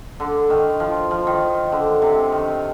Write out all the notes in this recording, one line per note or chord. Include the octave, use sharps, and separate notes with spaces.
D3
D#3
F3
F3
D#3
D3
C3
D#3